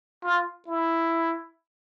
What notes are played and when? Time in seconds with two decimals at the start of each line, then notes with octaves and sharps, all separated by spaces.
0.24 F4
0.68 E4